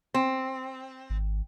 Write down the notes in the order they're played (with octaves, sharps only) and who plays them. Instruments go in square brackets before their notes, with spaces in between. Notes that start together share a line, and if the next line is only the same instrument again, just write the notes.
[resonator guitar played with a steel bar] C4
[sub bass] G#1